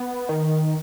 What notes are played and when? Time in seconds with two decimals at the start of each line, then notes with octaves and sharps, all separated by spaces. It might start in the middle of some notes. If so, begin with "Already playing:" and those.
Already playing: B3
0.29 D#3